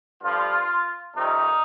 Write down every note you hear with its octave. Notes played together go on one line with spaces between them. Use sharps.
G2 D3 F3 F4
F2 C3 D#3 G3 D#4